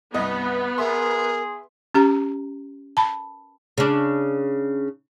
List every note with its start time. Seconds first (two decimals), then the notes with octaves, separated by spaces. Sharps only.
0.14 C2 G2 B3 D#5
0.78 G#4 A#4 E5 C6
1.94 C#4 G4 A#5
2.97 A5 B5
3.78 C#3 D4